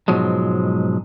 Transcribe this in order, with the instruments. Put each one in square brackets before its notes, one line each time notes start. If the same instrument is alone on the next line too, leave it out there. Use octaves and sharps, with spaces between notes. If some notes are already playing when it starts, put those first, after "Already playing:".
[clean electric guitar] G#2 B2 F3 F#3 G#3